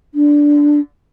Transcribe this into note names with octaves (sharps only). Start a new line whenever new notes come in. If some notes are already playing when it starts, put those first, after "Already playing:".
D4